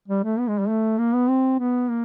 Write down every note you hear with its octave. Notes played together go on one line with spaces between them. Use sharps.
G3
A3
B3
G#3
G3
A3
A#3
B3
C4
B3
A#3